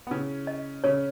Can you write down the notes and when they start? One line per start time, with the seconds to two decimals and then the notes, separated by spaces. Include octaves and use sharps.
0.07 B3
0.11 C#3 C#4 E4
0.47 D#5
0.84 C#3 C#4 C#5